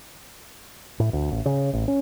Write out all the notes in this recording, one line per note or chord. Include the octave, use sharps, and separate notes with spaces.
A2
D2
A1
C#3
A1
C#4